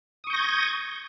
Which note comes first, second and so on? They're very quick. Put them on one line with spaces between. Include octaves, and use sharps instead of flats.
D#6 C#6 G6 A#6 G#6